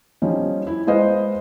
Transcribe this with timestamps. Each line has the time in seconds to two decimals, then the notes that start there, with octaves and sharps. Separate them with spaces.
0.22 F3 G3 C#4 D#4
0.67 E4
0.87 G#3 B4 C5 D#5 F5